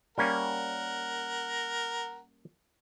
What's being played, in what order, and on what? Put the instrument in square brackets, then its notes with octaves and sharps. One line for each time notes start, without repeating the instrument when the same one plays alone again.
[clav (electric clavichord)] G3 A#3 C#4 [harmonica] A#4 F#5